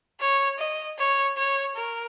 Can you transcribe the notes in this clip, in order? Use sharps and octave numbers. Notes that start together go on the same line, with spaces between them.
C#5
D#5
C#5
C#5
A#4